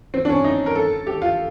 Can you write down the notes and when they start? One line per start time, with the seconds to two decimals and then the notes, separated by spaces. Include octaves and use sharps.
0.14 C4
0.25 D4
0.29 C#4
0.44 D#4
0.66 A#4
0.75 A4
1.07 G4
1.22 F4